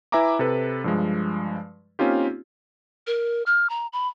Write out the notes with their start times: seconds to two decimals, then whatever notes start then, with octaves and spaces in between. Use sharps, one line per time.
0.12 E4 B4 E5 G#5 A#5 D6
0.39 C3 A4 B4
0.84 G2 F3 G#3
1.99 A#3 C4 C#4 D#4 F4 G4
3.07 A#4
3.46 F6
3.70 A#5
3.93 B5